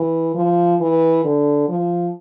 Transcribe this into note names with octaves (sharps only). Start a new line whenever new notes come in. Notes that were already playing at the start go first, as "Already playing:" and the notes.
Already playing: E3
F3
E3
D3
F3